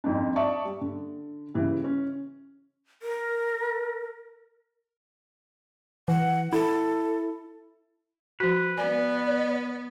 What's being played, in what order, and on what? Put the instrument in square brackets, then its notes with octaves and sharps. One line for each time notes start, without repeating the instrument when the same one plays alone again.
[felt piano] F2 G#2 D4
D5 E5 A5 C#6 D#6
G3
D3
C#3 E3 G3
C#4
[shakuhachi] A#4
[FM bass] E3 [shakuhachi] F#5
[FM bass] E4 [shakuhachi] A4
[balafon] F3 F#4 [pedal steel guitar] B4
[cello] B3 [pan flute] D5 [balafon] G#5